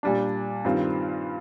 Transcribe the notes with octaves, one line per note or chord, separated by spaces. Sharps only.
A#2 G3 D4
G2 D#3 G3 C4 F4